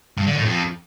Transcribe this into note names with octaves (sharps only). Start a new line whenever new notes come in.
G2
D3
A2
F2